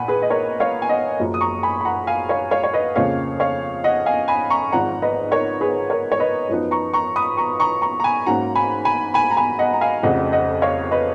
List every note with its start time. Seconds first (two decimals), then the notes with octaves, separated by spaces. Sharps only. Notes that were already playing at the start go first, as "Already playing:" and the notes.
Already playing: A#1 A#2 F#5 G#5 B5
0.08 G#4 B4
0.22 D#5
0.30 A#4 C#5
0.60 C#5 F5
0.82 G#5
0.89 D#5 F#5
1.19 F#1 F#2 F3
1.34 D#6
1.41 A#5 C#6
1.63 G#5 B5
1.81 B5
1.85 F#5 A#5
2.07 F5 G#5
2.29 C#5 F5
2.51 C#5 F5
2.64 C#5
2.73 B4 D#5
2.96 F2 C#3 F3 A#3 C#5 F5
3.40 C#5 F5
3.84 D#5 F#5
4.06 F5 G#5
4.28 G#5 B5
4.50 A#5 C#6
4.72 G#1 G#2 F3 F#5 A#5
5.02 B4 D#5
5.31 A#4 C#5
5.61 G#4 B4
5.90 A#4 C#5
6.12 C#5
6.20 B4 D#5
6.49 F#2 F3 B3 D#4
6.71 A#5 C#6
6.94 A#5 C#6
7.16 B5 D#6
7.37 A#5 C#6
7.60 A#5 C#6
7.82 A#5 C#6
8.00 A#5
8.04 G#5 B5
8.26 G#2 F#3 A#3 C#4 F#5 A#5
8.56 G#5 B5
8.85 G#5 B5
9.14 G#5 B5
9.31 A#5
9.37 G#5 B5
9.59 D#5 F#5
9.73 A#5
9.81 F5 G#5
10.03 F1 F2 C#3 F3 D#5 F#5
10.33 D#5 F#5
10.62 C#5 F5
10.91 B4 D#5